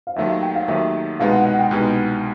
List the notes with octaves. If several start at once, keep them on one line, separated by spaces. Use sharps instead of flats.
F5
D#2 D#3 F#3 A3 E5
F5
G5
F5
D#2 D#3 F#3 A3 E5
C2 B2 G#3 B3 D#4 F5
F#5
F#5
G5
C2 B2 G#3 B3 D#4